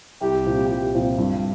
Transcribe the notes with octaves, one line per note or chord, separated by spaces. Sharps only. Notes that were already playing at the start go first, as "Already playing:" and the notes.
C2 G4
A#2 F3 C4
C2
A#2 F3 C4
G2